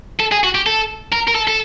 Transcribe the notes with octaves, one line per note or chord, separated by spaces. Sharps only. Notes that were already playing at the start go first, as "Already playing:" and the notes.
A4
G#4
F#4
G4
A4
A#4
A#4
A4
A4